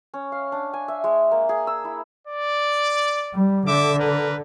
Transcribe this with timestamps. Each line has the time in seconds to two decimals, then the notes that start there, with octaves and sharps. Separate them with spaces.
0.14 C#4
0.32 F5
0.52 D4
0.73 G#5
0.88 E5
1.04 G#3
1.32 A#3
1.49 G#4
1.67 E6
1.85 E4
2.27 D5
3.34 G3
3.67 D3 E5 D6
3.98 A#4 B4